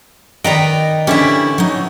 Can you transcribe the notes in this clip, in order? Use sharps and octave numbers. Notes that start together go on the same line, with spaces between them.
D#3 B4 D5 D#5 G5 A#5
D3 E3 C#4 E4 G4 E5
F#3 D#4